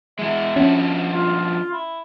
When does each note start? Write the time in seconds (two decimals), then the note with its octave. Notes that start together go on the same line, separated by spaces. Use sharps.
0.19 E3 G#3 E5
0.56 F3 C#4 D4 F#4
1.11 F4
1.72 E4